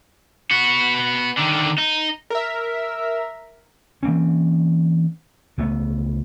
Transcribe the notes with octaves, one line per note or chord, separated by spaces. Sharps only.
B3 F#4
D3 D#3
D#4
A#4 E5
E3 A#3 C4 C#4
C#2 A3 B3